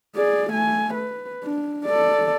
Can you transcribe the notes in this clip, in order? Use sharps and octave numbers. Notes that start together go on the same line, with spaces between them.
G#4 D5
A3 G#5
B4
D4
A4 D5